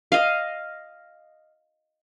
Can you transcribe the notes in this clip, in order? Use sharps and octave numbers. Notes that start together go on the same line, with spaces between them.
D#5 F5